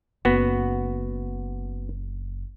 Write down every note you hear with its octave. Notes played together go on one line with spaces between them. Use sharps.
F#1 B3 F#4